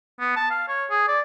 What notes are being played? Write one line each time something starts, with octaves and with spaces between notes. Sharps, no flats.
B3
A5
F5
C#5
G#4
D5